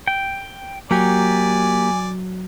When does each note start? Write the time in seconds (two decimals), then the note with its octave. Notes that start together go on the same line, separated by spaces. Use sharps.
0.07 G5
0.91 F#3 A#3 G4 D5 G#5